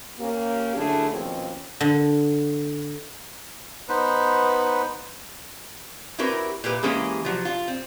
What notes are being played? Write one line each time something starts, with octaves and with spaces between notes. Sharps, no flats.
A#3 C#4 G4
F#2 D3 A3 D4 E4 G#4
D#2 B2 F3 C4 C#4
D3
B3 D#4 B4 C5
C4 E4 F#4 G4 A#4 B4
A#2 E4 G4 B4
E3 G#3 A#3 C#4 G4 G#4
F3 F#3
F4
C4